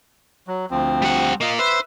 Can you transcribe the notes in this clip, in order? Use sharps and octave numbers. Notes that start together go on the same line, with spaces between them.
F#3
D2 F3 C4
G3 F#5
A#3 F4 D#5
B4 C5 E5 E6